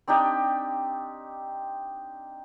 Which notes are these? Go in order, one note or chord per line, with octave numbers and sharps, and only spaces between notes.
C4 D4 D#4 G4